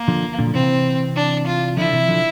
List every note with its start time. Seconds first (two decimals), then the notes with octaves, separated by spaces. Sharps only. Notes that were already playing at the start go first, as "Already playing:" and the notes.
Already playing: A#3
0.08 D3 F3
0.39 A#2 D3
0.47 F3
0.54 C3 E3 C4
1.15 D4
1.47 F4
1.77 D3 F3 E4
1.93 C3 E3
2.08 D3 F3